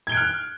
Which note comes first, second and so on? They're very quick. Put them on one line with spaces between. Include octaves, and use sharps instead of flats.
G#6 G7 D7 F#6 F6